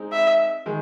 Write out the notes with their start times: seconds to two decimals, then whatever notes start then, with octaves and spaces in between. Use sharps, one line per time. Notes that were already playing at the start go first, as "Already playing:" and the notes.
Already playing: G#3 C4 D#4
0.13 E5
0.66 D#3 G#3